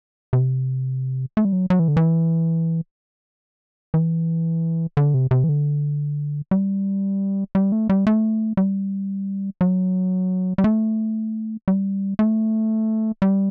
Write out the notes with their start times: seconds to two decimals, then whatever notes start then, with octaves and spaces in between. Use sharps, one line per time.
0.33 C3
1.37 A3
1.45 G3
1.53 F#3
1.70 F#3
1.79 E3
1.88 D3
1.97 E3
3.94 E3
4.97 D3
5.14 C3
5.31 C3
5.44 E3
5.49 D3
6.51 G3
7.55 G3
7.72 A3
7.89 G3
8.07 A3
8.57 G3
9.61 F#3
10.58 G3
10.64 A3
11.68 G3
12.19 A3
13.22 G3